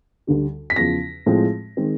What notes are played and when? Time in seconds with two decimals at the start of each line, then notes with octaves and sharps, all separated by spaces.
0.27 D2 D3 G3
0.70 B6
0.76 E2 C#3 F3 A#6
1.26 A2 F3 G#3 C4
1.77 D#3 G#3 C4